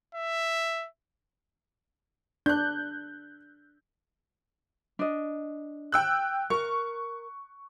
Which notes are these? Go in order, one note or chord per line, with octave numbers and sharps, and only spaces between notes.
E5
D4 F#6 G6
D4 D#5
G5 E6 F#6
A#4 C#6